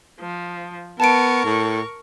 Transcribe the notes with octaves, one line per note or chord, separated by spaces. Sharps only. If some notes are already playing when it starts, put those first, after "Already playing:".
F3
B3 A#4 A5 C#6 D7
A2